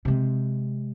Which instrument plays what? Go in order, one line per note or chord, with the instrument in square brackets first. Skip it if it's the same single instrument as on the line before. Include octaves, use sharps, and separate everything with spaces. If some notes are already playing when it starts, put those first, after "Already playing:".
[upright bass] C3 G#3